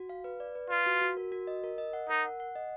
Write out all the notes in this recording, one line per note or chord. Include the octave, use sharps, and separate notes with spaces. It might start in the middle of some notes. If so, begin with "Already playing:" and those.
Already playing: F#4
F5
B4
D5
B4
F4 B4
F#4
F#4
A#4
F#4
D#5
A#4
D#5
F#5
D#4 A#4
F#5
F#5
D#5